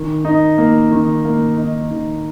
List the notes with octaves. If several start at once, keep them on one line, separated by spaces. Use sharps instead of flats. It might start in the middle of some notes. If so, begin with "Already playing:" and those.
Already playing: D#3
D#4
A#3
D#3
A#3
D#4
D#3